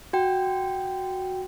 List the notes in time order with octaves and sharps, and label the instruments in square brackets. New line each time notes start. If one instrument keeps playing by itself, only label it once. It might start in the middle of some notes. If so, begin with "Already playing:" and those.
[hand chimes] F#4 G5